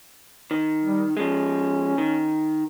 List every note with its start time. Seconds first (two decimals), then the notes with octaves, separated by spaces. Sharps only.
0.51 D#3
0.84 G3
1.17 F3 G#3 C#4
1.98 D#3